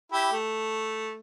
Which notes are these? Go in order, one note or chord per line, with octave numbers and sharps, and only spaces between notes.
E4 G4
A3